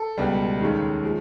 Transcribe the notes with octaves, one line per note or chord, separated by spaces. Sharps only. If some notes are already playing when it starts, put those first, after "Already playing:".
Already playing: A4
C#2 B2 G3
D#2 D#3 G#3 C#4
F3 G#3